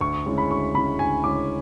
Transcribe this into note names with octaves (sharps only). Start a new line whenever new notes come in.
D2 C#6
C#3 G#3 C#4 E4
B5
D2 C#6
C#3 G#3 C#4 E4 B5
D2 G#5
C#3 G#3 C#4 E4 D6